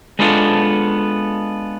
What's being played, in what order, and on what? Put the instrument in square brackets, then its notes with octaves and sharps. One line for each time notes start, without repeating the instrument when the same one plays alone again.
[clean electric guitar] G#3 B3 D4 F4 A4